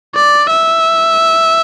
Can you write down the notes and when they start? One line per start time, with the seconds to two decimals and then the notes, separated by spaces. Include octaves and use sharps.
0.15 D5
0.50 E5